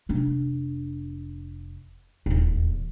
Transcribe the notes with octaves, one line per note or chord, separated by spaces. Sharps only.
F1 D4
D#1 E2